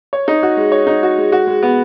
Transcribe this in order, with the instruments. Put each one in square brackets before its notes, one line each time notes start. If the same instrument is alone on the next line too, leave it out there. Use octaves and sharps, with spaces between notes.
[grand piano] C#5
D#4
F#4
G#3
C#5
D#4
F#4
G#3
F#4
G#3
B3